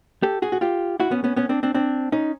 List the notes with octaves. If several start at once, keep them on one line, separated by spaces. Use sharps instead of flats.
G4 A4
F#4 G#4
F#4
F4 G4
E4 F#4
B3 C#4
B3 C#4
B3 C#4
C4 D4
C4 D4
C4 D4
C#4 D#4